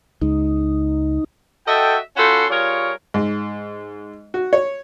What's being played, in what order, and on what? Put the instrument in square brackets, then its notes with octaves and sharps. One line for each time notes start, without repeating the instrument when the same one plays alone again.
[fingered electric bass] C#2 G#3 [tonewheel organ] D#4
[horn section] F#4 A4 D#5 E5 G5
C#4 F4 F#4 A4 B5 C6
G3 F4 G#4 A#4 C#5
[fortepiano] G#2
F#4
C#5